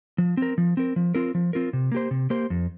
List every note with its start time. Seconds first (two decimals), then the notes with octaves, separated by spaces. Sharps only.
0.18 F3
0.37 C4 A#4
0.58 F3
0.77 C4 A#4
0.96 F3
1.15 C4 F4 A#4
1.35 F3
1.53 C4 F4 A#4
1.73 C3
1.92 A#3 G4 C5
2.11 C3
2.30 A#3 G4 C5
2.50 F2